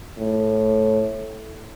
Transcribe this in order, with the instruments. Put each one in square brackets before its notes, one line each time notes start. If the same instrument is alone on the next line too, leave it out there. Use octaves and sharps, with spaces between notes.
[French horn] A2